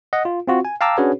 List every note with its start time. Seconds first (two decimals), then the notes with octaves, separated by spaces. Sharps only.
0.13 D#5 F#5
0.25 F4
0.47 C4 F4 F#4
0.65 G#5
0.81 F5 G5 A5 A#5 D6 E6
0.98 C#4 D4 F#4 G#4 B4 C#5